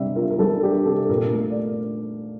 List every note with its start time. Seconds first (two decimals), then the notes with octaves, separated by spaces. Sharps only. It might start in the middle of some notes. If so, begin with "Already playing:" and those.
Already playing: C3 G3 D4 E5
0.16 F4 A#4
0.30 A#4
0.39 G3 A4
0.63 D4 G4
0.86 C3 A4
1.09 A#2 A#4
1.33 A3
1.50 D5